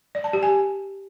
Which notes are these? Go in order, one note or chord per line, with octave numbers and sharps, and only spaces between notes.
D5
A5
G4
G#5